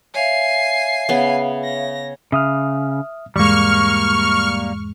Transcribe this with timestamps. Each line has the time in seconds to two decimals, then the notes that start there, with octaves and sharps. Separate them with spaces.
0.14 C#5 E5 F5 G#5 C7
1.09 C#3 B3
1.64 A#6
2.32 C#3 E5 D#6 F6
3.36 E2 G#2 G3 G#3 A#3 C#6 F6